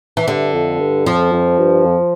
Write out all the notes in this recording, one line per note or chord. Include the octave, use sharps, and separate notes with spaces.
E3
G2 D3
F2
G2
F2 F3
F2
G2
F2